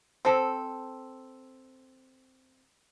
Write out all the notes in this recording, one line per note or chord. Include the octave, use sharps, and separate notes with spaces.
C4 A4